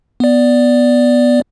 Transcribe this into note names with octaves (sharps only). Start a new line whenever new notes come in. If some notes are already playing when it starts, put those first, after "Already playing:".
B3 D5